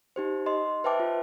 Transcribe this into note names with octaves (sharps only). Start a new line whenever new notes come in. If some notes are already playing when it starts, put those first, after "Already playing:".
D#4 G4 C5
D#5 C6
B4 C5 E5 G5 A5 D6
F4